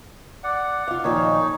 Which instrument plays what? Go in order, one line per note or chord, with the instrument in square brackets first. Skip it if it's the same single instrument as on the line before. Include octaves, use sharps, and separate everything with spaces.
[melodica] D5 F#5
[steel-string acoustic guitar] F4 F5
[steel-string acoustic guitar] A#2 D#3 F3 [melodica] D#4 C#5